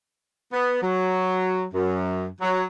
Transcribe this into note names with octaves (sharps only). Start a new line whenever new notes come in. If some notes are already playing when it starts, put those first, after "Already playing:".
B3
F#3
F#2
F#3